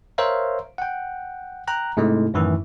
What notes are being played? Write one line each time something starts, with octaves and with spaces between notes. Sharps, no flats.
A#4 C5 C#5 E5 F5 A#5
F#5 G5
G5 A#5 F#6
G#2 C3 G#3 A3 E4
F#2 A2 D#3 E3 E4